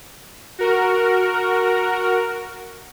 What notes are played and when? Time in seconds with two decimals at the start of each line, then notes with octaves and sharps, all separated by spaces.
0.59 F#4 A#4